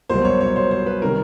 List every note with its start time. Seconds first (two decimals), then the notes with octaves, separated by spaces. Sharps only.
0.10 C2 B2 F#3 A#3 C5
0.25 C#5
0.41 C#5
0.56 C5
0.71 C5
0.86 B4
1.02 C3 D#3 G3 A#4